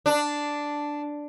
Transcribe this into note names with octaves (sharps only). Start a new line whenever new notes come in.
D4